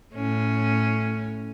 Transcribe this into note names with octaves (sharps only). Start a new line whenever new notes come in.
A2 C#4